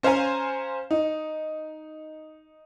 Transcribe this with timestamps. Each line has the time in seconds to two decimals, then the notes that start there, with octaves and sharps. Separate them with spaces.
0.03 C#4 C5 F5 G#5 A#5
0.91 D#4